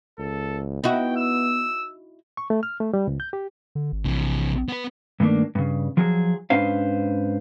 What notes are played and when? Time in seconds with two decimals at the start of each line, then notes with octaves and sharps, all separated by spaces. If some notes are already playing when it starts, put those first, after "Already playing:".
0.18 C#2 A4
0.84 B3 D#4 E4 F#4 G5
1.16 E6
2.37 C#6
2.50 A3
2.63 F6
2.80 A3
2.94 G3
3.07 C#2
3.20 G6
3.33 G4
3.75 D3
3.92 G#1
4.06 A#1 C3 E3
4.68 B3 B4
5.20 G2 D#3 A3 A#3 D4
5.55 G2 C#3
5.97 F3 F#3 G#4
6.50 G#2 C#4 D4 B4 C5 F5